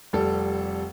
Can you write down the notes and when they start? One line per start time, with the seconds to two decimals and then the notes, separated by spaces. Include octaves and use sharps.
0.13 F1 G3 A4